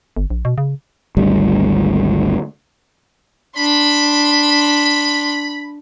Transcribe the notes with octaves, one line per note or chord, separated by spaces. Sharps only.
G1
A#1
B2
C#3
G#1 D2 G3
D4 B5 C6